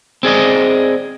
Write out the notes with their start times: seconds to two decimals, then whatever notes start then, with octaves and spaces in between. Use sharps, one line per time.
0.23 C4 G#4 D5 D#5